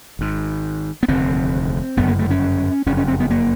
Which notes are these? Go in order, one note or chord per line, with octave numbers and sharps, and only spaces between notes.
G#1 G#2
B3
F1 D#2 D3 C4
G1 F#2 C#3 B3
A#3
A3
C#4
F#1 F2 C#3 C#4
C#4
C4
B3
A#3